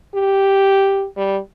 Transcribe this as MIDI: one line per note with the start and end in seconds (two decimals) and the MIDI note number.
0.15 1.05 67
1.16 1.38 55